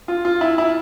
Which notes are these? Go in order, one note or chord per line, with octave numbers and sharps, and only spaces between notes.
F4
F4
E4
E4